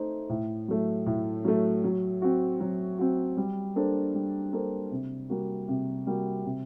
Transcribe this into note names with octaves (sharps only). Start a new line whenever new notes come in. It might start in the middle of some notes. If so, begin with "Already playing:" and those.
Already playing: A3 D#4 A4 C5
A2
F#3 A3
A2
F#3 A3
F#3
C4 F#4
F#3
C4 F#4
G3
A#3 D4 A4 C5
G3
A#3 D4 A4 C5
C3
G3 A#3 F#4
C3
G3 A#3 F#4
C3